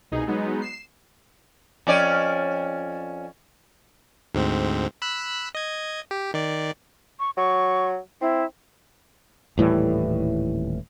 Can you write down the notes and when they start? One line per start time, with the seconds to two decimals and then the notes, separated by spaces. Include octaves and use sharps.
0.12 C2 B2 D#4 G#4
0.27 F#3 G#3 B3 D#4
0.62 C7 E7
1.87 F2 C#4 D5
4.35 D2 G#2 C4
5.02 B5 E6 F#6
5.55 D#5 G#6
6.11 G4
6.34 D#3 D5
7.20 C#6
7.37 F#3 C#6
8.21 C4 E4
9.58 D#1 A2 E3 G3